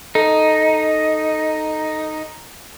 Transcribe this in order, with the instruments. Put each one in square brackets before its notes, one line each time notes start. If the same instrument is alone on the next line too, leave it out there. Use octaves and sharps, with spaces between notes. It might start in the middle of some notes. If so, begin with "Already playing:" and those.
[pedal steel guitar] D#4 [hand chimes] A4